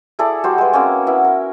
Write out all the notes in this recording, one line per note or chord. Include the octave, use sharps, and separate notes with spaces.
E4 G#4 A4 D5
G3 F#4 C5
G#3 B4
A#3 C4 C#4
B3 E4
A#4